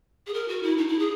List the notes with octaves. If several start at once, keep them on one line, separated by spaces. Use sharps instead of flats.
G#4
A#4
F#4
E4
D#4
E4
G#4